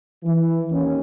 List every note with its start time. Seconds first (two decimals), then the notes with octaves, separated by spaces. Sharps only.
0.24 E3
0.70 D#2 C#4